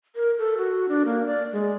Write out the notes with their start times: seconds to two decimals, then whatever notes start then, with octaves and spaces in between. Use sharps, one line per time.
0.16 A#4
0.38 A4
0.58 F#4
0.89 D4
1.06 A#3
1.26 D5
1.53 G#3